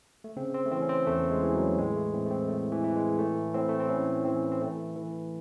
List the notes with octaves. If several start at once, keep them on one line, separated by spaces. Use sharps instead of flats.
A3
C#3 C4
C4
A3
E3 C4
C#4
C4
E2 A3
G#3
E3
F#3
A2 G#3
A3
A2 C4
A3
C4
A2 A3
E3
E3
G#3
A2 A3
A2 C4
A3
C4
A2 C#4
E3 C4
C4
E3 A3
E3